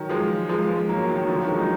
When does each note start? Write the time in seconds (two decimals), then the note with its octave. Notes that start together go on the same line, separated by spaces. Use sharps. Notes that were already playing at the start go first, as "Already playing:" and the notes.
Already playing: D#3 F#3
0.09 F3 G#3
0.49 F3 G#3
0.69 F3 G#3
0.89 F#3 A#3
1.09 D#3 F#3
1.24 D#3
1.28 D3 F3
1.38 D#3 F#3
1.48 F3 G#3
1.58 D#4 F#4